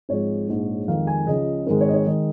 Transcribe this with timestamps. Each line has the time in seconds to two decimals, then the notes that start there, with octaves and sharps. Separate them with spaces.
0.09 G#1 G#2 F3 G#3 C#5
0.48 A#1 G#2 G#3
0.88 F2 D#3 G#3 F5
1.07 G#5
1.27 C#2 C#3 F3 D#5
1.67 G#1 G#2 D#3 G#3 A#4
1.81 C#5
1.89 D#5
1.94 C#5
2.06 D#3 G#3 D#5